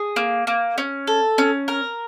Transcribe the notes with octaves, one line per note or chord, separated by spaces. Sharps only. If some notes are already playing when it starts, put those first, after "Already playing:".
Already playing: G#4
A#3
A#3
C#4
A4
C#4
A#4